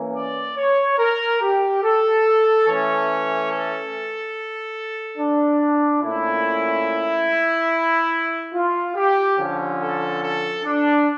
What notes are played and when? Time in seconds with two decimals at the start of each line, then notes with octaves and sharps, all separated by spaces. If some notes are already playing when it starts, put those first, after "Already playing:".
Already playing: E3 A#3 C#4
0.15 D5
0.57 C#5
0.98 A#4
1.41 G4
1.83 A4
2.67 E3 A3 C#4 C#5
3.50 A4
5.18 D4
6.02 A#2 A3 C#4 E4
8.54 F4
8.96 G4
9.38 D3 F3 C#4
9.80 A4
10.22 A4
10.64 D4